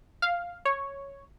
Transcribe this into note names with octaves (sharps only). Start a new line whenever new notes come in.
F5
C#5